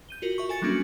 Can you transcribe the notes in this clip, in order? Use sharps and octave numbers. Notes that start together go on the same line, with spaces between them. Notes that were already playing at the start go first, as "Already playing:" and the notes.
G6 D#7 G7
F4 F#4 A#4
E5 C#6 F#7
A4 G#5 A6 C#7
F#3 G3 A#3 C#4 D4 F#4